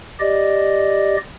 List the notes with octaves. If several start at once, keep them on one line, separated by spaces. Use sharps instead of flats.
G4 D5 D#5